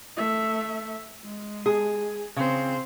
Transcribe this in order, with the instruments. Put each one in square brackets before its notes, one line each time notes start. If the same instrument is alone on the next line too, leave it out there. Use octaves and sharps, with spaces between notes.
[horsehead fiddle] A3 E5
G#3
[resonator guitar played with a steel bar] G#4
[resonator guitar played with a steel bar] C#3 [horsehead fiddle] C4 C5